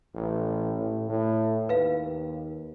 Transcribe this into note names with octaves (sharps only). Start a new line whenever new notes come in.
A1
A2
A2
D#2 B4 F5